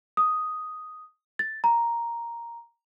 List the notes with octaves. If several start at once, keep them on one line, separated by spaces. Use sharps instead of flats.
D#6
A6
A#5